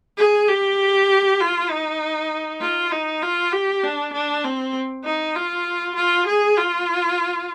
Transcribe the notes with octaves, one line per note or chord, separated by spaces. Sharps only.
G#4
G4
F4
D#4
F4
D#4
F4
G4
D4
D4
C4
D#4
F4
F4
G#4
F4